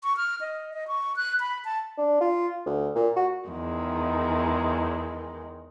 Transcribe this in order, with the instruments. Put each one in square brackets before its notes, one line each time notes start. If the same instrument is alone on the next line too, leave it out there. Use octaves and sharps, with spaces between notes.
[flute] C#6
F6
D#5
D#5
C#6
F#6
B5
A5
[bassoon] D4
F4
D2
A#2
F#4
[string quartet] E2 D#3 G#3